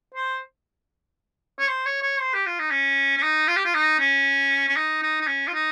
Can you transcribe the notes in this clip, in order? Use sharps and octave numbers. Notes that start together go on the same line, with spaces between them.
C5
C#5
C5
C#5
C#5
C5
G4
F4
D#4
C#4
C#4
D#4
F4
G4
F4
D#4
C#4
C#4
D#4
D#4
D#4
C#4
F4
D#4